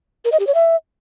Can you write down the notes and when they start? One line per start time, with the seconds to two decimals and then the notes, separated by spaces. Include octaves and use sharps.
0.25 A#4
0.32 D#5
0.40 G4
0.47 C#5
0.54 E5